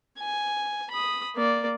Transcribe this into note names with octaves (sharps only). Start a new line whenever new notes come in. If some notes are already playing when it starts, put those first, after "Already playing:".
G#5
B5 D#6
A#3 D5